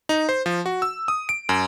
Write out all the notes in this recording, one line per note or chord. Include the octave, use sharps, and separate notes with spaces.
D#4
C5
F3
F#4
E6
D#6
D7
F#2